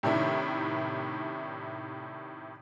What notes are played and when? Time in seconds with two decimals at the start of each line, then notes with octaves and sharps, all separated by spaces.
0.03 A2 C3 D#3 A3 D4 E4